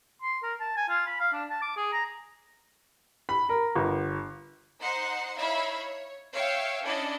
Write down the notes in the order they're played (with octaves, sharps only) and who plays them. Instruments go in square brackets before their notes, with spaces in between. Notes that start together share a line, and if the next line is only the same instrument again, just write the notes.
[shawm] C6
A#4
A5
G#5
F4
B5
F5
D4
A5
D6
G#4
A#5
[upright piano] B5
A#4
G1
[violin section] D#4 C5 F#5 C6
D#4 E4 C#5 E5 F5 B5
C#5
C#5 E5 F5 G5
C#4 D4 E4 D5 D#5